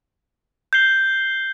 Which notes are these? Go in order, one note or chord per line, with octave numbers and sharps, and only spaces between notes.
G6 C7 G7